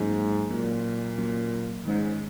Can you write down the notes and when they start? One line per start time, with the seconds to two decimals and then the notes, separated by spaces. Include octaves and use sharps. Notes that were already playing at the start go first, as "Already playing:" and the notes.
Already playing: G#2 F#3 A#3 C#4
0.50 A#2 F#3 A#3 C#4
1.18 F#3 A#3 C#4
1.85 G#2 D#3 G#3 C#4